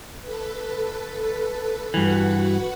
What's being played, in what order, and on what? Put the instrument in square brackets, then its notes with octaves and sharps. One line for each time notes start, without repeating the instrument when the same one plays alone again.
[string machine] A4 B4
[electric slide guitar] G2 E3 [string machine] F#4 B4 F#5